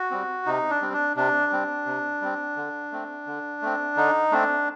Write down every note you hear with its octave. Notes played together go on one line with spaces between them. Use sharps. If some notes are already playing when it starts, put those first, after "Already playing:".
Already playing: F#4
G3 C4
C3 D#4
D4
G3 C4
D4
C3 D4
G3 C4
C3
G3 C4
D3
A3 C4
D3
A3 C4
D3 D#4
A3 C4 D4